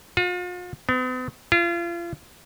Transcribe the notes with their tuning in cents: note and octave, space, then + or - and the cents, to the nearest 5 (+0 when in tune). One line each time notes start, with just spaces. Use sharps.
F4 +40
B3 +45
F4 -35